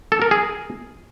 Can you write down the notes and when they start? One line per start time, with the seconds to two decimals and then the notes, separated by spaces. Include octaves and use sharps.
0.12 A4
0.22 A#4
0.31 G#4